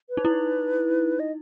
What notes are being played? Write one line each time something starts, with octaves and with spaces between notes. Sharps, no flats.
B4
D#4
E4
D#5